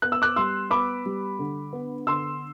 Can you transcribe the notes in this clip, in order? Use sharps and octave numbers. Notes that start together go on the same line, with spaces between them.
B3 F#6
E6
D6 F#6
G3 C6 E6
B3 B5 D6
G3
D3
B3
D3 C6 E6